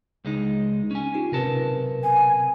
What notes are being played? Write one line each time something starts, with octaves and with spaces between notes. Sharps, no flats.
C#2 G#3 D#4
C#4 G#5
D#4 F4 G4
B1 C3 C4 A#4 B4 A5
G#5